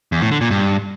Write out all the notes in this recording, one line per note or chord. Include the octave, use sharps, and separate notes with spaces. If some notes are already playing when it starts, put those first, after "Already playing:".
E2
A2
D3
A#2
G2